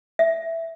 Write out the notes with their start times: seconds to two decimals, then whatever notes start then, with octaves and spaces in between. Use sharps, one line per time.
0.19 E5